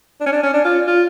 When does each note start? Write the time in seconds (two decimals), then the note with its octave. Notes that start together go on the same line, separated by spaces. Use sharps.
0.21 D4
0.26 C#4
0.32 D4
0.43 C#4
0.54 D4
0.65 F4
0.87 F4